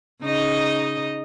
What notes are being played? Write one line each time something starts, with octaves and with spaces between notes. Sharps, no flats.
C#3 D#4 D#5